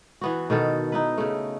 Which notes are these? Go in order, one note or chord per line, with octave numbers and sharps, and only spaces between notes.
E3 B3 F#4
B2 D#3 B3 A4
D#4 E4 B4
C#3 A3